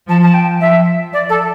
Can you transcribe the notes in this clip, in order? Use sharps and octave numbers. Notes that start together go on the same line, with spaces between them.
F3 A5
A5
G5
F3 E5
F3 D5
A4